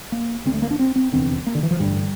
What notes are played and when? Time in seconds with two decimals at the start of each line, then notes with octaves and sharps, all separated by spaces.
0.12 A#3
0.46 D2 D3 C4
0.54 A3
0.62 A#3
0.71 D4
0.79 C4
0.96 C4
1.13 F1 E2 D3 C4
1.47 A#3
1.55 D3
1.63 E3
1.71 F3
1.79 A1 G2 D3 G3